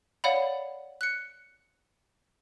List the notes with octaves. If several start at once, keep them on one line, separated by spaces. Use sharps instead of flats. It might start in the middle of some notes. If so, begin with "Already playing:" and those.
C#5 D5 F5 F#5 B5
F#6 C#7